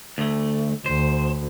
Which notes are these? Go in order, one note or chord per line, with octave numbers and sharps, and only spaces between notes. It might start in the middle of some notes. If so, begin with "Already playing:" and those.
D2 A3
D2 C5